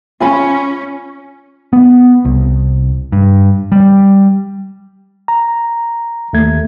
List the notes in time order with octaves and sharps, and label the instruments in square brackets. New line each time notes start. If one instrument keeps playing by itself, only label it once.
[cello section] C#4 [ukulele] F4 G#5 B5
[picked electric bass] B3
C2
G2
G3
[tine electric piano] A#5
D#2 A3 G#6